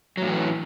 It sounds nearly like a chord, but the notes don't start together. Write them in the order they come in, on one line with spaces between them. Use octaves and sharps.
F#3 A2 E3